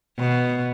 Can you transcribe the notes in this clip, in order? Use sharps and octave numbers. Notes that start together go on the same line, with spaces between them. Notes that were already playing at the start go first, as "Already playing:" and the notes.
B2